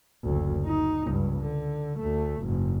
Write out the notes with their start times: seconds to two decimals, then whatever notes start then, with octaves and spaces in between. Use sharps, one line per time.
0.24 F#1 D2
0.65 D#4
1.06 C#2 G2
1.39 D3
1.99 D2 A3
2.43 F#1 G#2